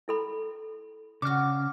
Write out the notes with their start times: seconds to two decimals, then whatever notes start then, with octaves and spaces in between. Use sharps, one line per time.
0.08 E4 A4 B5
1.22 C#3 D4 F#4 D6 F6